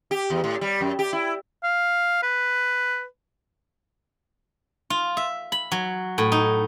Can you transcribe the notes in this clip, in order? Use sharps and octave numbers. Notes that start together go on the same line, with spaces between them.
G4
E2
A2
G3
F#2
G4
E4
F5
B4
F4
E5
B5
F#3
A2
D#4